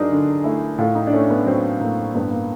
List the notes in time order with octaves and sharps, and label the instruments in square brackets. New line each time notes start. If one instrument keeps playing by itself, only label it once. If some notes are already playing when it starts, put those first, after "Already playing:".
Already playing: [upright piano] G2 F#3 D4 D#4 G#4 A#4
D3
A3 E4
A2 F4
D#4
D4
A3 C#4
B3
F#3 C4
A2 A#3
G2 B3
A#3